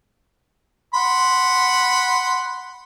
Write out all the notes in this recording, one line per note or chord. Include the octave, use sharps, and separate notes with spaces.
F#5 B5 C6